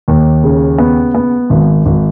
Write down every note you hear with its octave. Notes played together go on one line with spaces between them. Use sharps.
D#2
C#3
B3
B3
G#1
G#1